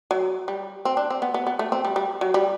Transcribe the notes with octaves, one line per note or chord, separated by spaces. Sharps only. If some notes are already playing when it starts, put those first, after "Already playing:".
F#3
G3
C4
D4
C4
B3
B3
B3
A3
C4
G3
G3
F#3
G3